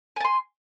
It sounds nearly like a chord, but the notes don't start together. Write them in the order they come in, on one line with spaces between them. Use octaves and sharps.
G#5 A5 C6